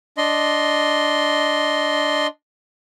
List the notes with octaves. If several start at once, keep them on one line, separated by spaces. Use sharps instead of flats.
D4 D#5 C6